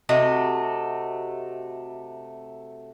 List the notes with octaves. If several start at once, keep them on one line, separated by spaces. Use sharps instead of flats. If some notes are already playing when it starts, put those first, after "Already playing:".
C3 A3 F#4 D#5